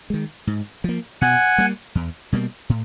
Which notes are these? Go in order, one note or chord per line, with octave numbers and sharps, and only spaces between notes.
D#3 G#3
G#2
F3 A#3
B2 F#5 G#5
G3 A#3
E2
B2 G3 A#3
A2